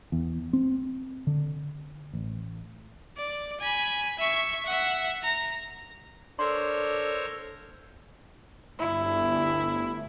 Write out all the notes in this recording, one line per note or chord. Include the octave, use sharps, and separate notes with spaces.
E2
C4
D3
A1
D5
G#5 B5
E5 C#6
E5 F#5
A#5
D4 A4 A#4 C5 C#5 C6
G1 D2 G2 E4